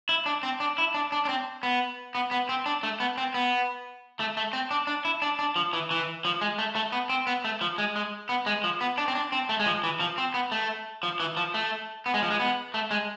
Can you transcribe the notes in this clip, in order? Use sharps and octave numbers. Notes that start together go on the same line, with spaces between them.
E4
D4
C4
D4
E4
D4
D4
D4
C4
B3
B3
B3
C4
D4
A3
B3
C4
B3
A3
A3
C4
D4
D4
E4
D4
D4
F3
E3
E3
F3
G#3
A3
A3
B3
C4
B3
A3
F3
G#3
G#3
B3
G#3
F3
B3
D4
C4
D4
C4
A3
G#3
F3
E3
F3
C4
B3
A3
F3
E3
F3
A3
B3
G#3
F3
G#3
B3
A3
G#3